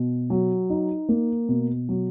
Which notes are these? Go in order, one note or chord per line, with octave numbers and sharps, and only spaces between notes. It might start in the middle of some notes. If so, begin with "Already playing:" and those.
Already playing: B2
F#3
D#4
A#3
B2
F#3